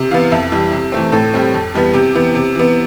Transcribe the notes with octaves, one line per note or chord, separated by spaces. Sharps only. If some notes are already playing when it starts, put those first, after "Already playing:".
Already playing: C3
E3 B3 F5
F2 E5
E3 G3
C3
E3 A3 C4
A2 A4
G3 C4
F2
E3 G3 B3
C3 G4
E3 B3
C3
E3 B3